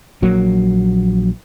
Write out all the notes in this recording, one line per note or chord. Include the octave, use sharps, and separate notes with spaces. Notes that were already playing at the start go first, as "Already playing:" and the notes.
A#1 F#3 A#3